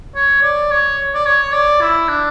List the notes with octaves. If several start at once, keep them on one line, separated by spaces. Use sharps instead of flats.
C#5
D5
C#5
D5
C#5
D5
E4
D4